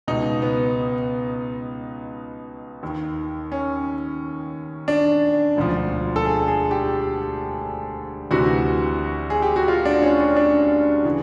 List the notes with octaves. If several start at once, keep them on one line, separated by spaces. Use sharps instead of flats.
C#2 B2 D#4
B3
D#2 D#3
C#4
D4
E1 D2 D3 F3
A4
G#4
G#4
G4
D2 C3 E3 F#4
G#4
G4
F#4
F4
D4
C#4
C#4
D4
C#3 E3